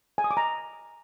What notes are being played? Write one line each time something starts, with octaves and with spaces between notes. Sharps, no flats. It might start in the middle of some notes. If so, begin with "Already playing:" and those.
G#5
D#6
D6
A#5